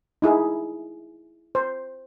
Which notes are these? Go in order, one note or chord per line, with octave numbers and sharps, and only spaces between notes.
D#4 E4 G#4
C5